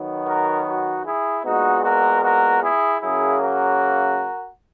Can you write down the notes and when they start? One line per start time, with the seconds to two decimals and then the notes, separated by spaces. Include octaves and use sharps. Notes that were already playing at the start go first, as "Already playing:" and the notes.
Already playing: D#3 F#3 B3
0.25 F#4 A#4
0.65 D#4 F#4
1.04 E4 G#4
1.44 A#2 G#3 B3 D#4 F#4
1.83 F#4 A#4
2.23 F#4 A#4
2.62 E4 G#4
3.01 C#3 F#3 A#3 E4 G#4
3.41 F#4 A#4